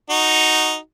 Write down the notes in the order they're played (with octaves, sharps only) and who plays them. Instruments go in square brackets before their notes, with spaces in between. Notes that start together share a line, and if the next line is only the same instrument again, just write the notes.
[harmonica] D#4 F#4